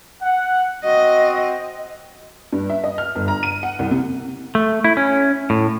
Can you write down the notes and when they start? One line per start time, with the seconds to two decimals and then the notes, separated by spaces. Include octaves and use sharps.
0.21 F#5
0.85 C4 F#4 D#5
2.52 G2
2.70 E5
2.84 D#5
2.98 F6
3.15 G1
3.28 A#5
3.43 D#7
3.63 F#5
3.79 C2
3.91 C3
4.55 A3
4.84 E4
4.97 C#4
5.50 A2